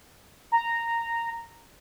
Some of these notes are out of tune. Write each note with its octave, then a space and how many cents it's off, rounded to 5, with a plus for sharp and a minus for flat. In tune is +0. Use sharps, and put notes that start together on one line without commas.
A#5 -10